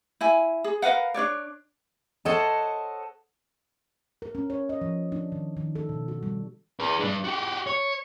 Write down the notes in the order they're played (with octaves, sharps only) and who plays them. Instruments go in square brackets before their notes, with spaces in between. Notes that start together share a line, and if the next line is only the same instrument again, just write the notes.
[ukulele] E4 G#5
G#4
A#4 B4 F5 F#5
D4 F4 C#5 D5
[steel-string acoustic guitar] A4 C5 C#5 D#5 F#5 A5
[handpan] A#4
C#4
C#5
D#5
F3
D4
D#3
D#3
A4
B2
F#4
G3
[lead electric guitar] G#4 B4
G3 D4
F#4 G4
C#5